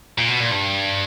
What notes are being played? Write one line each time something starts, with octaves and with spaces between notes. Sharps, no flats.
A#2
B2
A#2
G2